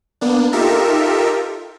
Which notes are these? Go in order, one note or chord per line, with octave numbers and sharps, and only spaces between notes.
A#3 B3 D4
D#4 F4 G4 A4 A#4 E5